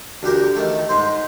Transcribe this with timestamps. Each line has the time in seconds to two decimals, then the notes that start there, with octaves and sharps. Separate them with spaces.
0.23 D2 G4 A#4
0.56 D#3 A3
0.89 G#2 C5